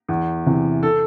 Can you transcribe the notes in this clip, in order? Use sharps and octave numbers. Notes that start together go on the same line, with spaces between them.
E2
C3 E3
A4